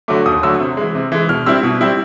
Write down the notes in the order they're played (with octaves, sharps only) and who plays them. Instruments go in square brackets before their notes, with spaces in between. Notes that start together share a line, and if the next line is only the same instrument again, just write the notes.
[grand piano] D3 F#3 A3 D6
D#2 D#6
D3 F#3 A3 E6
C3
E3 G#3
C3
E3 G#3
B2 F6
G3 C4 E4 E6
B2
G3 C4 E4